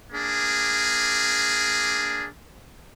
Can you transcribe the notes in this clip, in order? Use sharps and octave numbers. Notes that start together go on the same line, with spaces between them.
A#3 D4 G#4